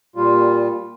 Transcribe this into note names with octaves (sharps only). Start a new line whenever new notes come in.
A#2 G3 F4